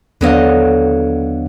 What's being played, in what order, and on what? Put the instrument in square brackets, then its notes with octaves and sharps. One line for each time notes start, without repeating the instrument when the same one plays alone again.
[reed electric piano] D#2 B3 F5 [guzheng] D3 F#3 D#5